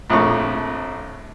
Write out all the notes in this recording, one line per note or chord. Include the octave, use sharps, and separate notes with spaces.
A#1 F2 A2 C#6